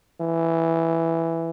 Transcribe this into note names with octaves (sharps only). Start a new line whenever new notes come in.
E3